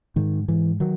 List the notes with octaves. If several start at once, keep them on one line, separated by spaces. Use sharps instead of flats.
G#2 D#3
G#2 E3
D#3 F#3